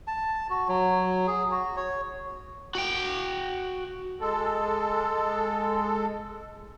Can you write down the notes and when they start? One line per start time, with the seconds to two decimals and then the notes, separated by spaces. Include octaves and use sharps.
0.07 A5
0.50 F#4
0.68 F#3
1.27 G#4
1.51 F#4
1.76 C#5
2.75 F#4 G5
4.21 G#3 A4